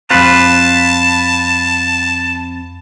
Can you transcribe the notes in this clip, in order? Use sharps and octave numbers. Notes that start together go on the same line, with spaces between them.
F2 C4 F4 B4 A5